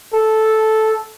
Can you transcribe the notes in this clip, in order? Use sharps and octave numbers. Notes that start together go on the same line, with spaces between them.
A4